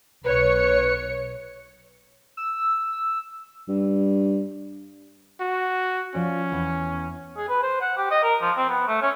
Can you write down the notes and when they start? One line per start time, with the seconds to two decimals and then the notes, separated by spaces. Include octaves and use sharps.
0.25 B1 B4 C#5 C#7
2.37 E6
3.68 G2
5.41 F#4
6.15 F3 C#4 D5
6.52 E2
7.37 G#4
7.49 B4
7.63 C5
7.81 F#5
7.97 G4
8.11 D#5
8.23 A#4
8.42 F3
8.57 C4
8.69 B3
8.88 A3
9.02 C#4